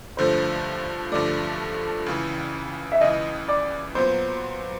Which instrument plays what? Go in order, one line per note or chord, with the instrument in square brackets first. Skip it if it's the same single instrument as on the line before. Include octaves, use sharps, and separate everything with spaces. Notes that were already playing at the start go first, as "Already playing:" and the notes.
[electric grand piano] G2 D3 F3 A3 [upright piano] C5
[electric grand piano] G2 D3 F3 A3 [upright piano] D5
[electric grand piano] C#2 C#3 E3
[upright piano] E5
[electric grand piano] C#2 C#3 E3 [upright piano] D#5
[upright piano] D5
[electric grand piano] A#2 F#3 B3 [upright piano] C5